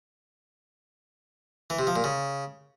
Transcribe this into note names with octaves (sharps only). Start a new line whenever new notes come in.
E3
C3
F3
A#2
C#3